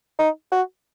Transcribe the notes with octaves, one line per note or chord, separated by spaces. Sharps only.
D#4
F#4